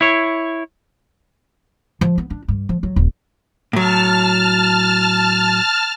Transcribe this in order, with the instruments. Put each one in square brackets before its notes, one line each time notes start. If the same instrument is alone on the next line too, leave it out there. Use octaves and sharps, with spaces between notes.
[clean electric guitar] E4 C#5
[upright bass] F3
B3
D4
G2
F3
F#3
D#1
[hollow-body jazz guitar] A2 F#3 [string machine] A5 F6